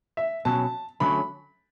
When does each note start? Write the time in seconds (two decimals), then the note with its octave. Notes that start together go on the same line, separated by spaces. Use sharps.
0.17 E5
0.45 B2 F#3 C#4 A5
1.00 D3 F#3 A3 C#4 B5